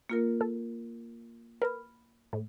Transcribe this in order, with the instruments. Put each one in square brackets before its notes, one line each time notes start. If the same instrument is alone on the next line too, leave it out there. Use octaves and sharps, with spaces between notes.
[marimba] A#3 F4 A#4
[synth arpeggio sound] A4
[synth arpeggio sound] A#4 B4 [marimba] B5 F6
[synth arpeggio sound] A2